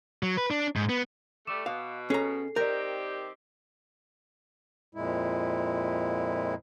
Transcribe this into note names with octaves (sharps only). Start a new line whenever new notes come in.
F#3
B4
D4
G#2
B3
G3 A3 D6 E7
B2 F5
C#4 G#4 A4 A#5 C7
D#3 C4 G4 A#4 D5 G6
F2 A#2 G#3 E4